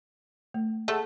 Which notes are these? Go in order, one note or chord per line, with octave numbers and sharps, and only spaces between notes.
A3
A3 G#4 F#5 A5